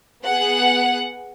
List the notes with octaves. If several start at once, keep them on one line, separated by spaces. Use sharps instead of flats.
B3 G#4 F#5